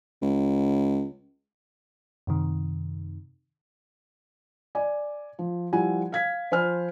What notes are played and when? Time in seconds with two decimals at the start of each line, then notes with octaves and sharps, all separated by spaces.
0.22 C#2
2.27 F#2 C3 D#3
4.75 D5 G#5
5.39 F3
5.73 F3 G3 E4 F#5 G#5
6.12 F5 G#6 B6
6.51 F3 C5 G#5 B5 F6